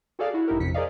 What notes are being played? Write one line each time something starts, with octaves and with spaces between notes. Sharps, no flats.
F#4 G#4 A4 D5 F5
E4 F#4
A1 G2 D#4 E4 G4 A#4
A1 F2 C3 B6 C#7
G#4 A#4 C5 D5 D#5 F5